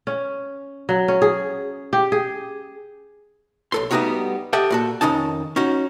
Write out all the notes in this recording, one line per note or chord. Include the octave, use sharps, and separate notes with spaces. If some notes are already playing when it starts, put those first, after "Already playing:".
C#4
F#3
C#4
G#4
G4
G#4
B1 A4 C6
G3 A3 B3 D#4 F#4 C#5
G4 A4 D#5 E5 F#5 G5
A#2 F#4 A4
F2 D#3 C#4 D#4 A5
C#4 D#4 F#4